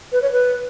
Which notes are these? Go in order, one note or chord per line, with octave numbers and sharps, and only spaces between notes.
B4
C#5
B4